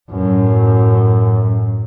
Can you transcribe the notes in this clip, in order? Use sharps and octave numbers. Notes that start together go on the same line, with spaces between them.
F#2 A2